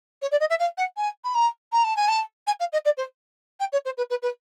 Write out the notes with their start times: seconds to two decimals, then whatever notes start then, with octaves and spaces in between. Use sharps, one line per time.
0.22 C#5
0.31 D5
0.40 D#5
0.50 E5
0.59 F5
0.77 F#5
0.97 G#5
1.24 B5
1.34 A#5
1.72 A#5
1.84 A5
1.96 G#5
2.08 A5
2.47 G#5
2.60 F5
2.72 D#5
2.85 D5
2.97 C5
3.60 G5
3.72 C#5
3.85 C5
3.97 B4
4.10 B4
4.22 B4